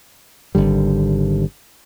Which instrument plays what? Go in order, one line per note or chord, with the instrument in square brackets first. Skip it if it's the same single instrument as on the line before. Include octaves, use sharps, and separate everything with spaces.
[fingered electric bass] G#1 D#2 D3 G3